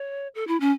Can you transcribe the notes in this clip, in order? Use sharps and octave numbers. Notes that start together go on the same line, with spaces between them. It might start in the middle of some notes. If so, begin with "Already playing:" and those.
Already playing: C#5
A4
E4
C#4